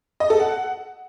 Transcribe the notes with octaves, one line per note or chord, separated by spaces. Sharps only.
D#5
A4
F#5